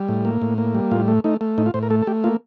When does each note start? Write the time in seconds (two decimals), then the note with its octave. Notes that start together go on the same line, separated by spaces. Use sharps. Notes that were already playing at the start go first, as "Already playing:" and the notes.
Already playing: G3
0.08 A2
0.25 A#3
0.42 A2
0.58 A#3
0.75 G3
0.91 A2 F4
1.08 A3
1.24 A3 D#4
1.41 A3
1.58 A2 D#4
1.66 F4
1.74 A2 C5
1.83 A#4
1.90 A3 A4
2.02 A4
2.07 A3 G4
2.24 A#3 F4